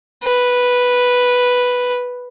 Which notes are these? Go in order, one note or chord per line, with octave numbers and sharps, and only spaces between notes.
B4